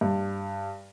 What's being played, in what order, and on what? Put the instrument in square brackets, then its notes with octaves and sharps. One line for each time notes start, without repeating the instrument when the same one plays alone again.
[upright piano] G2